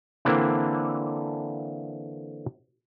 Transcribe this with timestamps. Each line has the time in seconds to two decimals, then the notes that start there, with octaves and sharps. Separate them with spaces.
0.25 D3 E3 A#3 C4 D4 E4